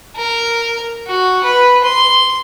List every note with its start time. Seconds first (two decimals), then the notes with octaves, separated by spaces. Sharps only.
0.16 A#4
1.07 F#4
1.44 B4
1.84 C6